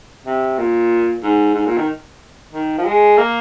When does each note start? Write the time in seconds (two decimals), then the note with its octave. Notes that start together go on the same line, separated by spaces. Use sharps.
0.26 C3
0.58 A#2
1.23 G#2
1.55 G#2
1.66 A#2
1.77 D#3
2.53 D#3
2.78 F3
2.85 G#3
3.17 A#3